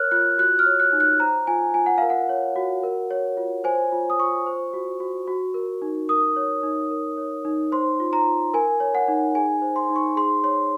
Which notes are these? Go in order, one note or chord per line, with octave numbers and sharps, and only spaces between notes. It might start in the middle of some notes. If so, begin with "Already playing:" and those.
Already playing: A#4 C#5 F6 F#6
F4 F#6
F#4 F#6
F6
C#5
F#6
D#4
F#6
C5 A#5
F4 G#5
F4 G#5
F#5
A#4 F5
F#5
C#5
F#4
A#4
C#5
F4
C5 G#5
F4
D#6
F4 C#6
C5
F#4
F#4
F#4
A#4
D#4
A#4 D#6
C#5
D#4
A#4
C#5
D#4
C5 C6
F4
A#5
F4
A#4 G#5
C#5
F#5
D#4
G#4 G#5
C5
C6
D#4
C#6
G#4 C6
C#5 C6